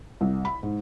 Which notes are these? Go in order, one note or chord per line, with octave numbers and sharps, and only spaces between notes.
C2
B5
G#2